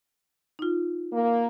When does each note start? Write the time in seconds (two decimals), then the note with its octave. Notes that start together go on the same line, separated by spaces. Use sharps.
0.59 D#4 F4
1.13 A#3